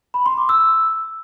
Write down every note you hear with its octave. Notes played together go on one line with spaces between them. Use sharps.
B5
C6
D6
E6